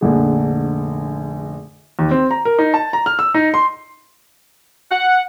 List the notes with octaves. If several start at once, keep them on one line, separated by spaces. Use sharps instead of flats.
F1 A#1 D3 G#4
D#2
C4
A#5
A#4
D#4
A5
A#5
F6
E6
D#4
C6
F#5